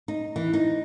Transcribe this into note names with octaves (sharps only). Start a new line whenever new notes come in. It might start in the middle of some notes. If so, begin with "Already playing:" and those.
D#4
E3
D#4